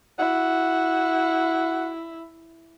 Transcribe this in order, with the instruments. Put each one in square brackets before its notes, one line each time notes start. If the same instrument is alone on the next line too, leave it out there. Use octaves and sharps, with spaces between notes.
[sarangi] E4 [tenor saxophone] F#4